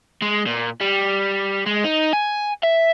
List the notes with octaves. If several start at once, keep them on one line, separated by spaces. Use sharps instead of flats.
G#3
A#2
G3
G#3
D#4
G#5
E5